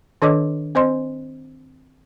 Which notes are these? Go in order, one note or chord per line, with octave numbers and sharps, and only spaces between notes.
D#3 D4 A4 C#5 D#5 D6
C4 C5 D#5 C6